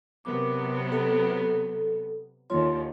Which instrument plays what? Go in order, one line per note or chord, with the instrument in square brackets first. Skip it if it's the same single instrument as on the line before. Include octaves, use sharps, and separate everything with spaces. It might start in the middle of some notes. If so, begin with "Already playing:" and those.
[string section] C3 F#3 B3 [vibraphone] A#4 D6
[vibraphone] A4
[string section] D#2 D3 [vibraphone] F4 C#5 C6